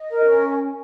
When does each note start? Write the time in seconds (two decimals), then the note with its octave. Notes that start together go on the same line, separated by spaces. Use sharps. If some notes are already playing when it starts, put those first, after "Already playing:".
Already playing: D#5
0.09 A#4
0.24 C#4